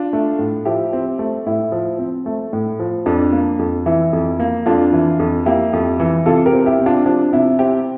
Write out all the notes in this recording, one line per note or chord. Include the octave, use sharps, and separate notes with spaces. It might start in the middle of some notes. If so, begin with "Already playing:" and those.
Already playing: D4 F4
A3
A2
F3 E4 G4
C4
A3
A2 E4
F3
C4
A3
A2
F3
F2 D4
A#3
F2
E3 E4
F2
A#3
F2 D4 F4
E3
F2
A#3 E4 G4
F2
E3
C3 F4 A4
G4 A#4
C4
E4 G4
C3
D4 F4
F3 D4
C3 E4
C4 E4 G4